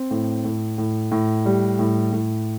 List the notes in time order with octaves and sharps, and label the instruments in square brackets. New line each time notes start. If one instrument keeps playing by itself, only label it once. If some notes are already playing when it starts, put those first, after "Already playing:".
Already playing: [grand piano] C4
A2
A2
A2
A2
G3
A2
A2